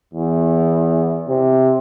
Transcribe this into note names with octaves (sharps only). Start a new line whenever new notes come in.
E2
C3